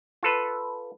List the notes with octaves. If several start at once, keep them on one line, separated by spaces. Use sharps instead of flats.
F4 A4 B4